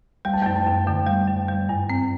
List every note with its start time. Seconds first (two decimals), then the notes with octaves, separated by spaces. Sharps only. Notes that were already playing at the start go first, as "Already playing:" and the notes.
0.25 G3 G5
0.33 A5
0.42 F#2 G5
0.56 A5
0.67 F#2
0.87 D3 G5
1.07 G3
1.27 F#2
1.48 G3
1.69 G2
1.90 C4